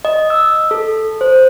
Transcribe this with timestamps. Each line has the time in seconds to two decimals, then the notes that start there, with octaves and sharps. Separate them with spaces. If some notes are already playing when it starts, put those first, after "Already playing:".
0.05 D#5
0.30 E6
0.71 A4
1.21 C5